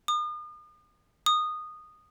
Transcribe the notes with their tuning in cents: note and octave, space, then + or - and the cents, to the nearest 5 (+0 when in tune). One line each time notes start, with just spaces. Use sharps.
D#6 -40
D#6 -15